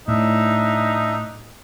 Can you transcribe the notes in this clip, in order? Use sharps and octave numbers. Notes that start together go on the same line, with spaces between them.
A2 D4 D#4 E5